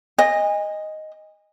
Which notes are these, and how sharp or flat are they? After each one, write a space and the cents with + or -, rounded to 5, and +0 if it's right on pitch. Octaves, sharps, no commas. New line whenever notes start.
D#5 +0 G#5 -30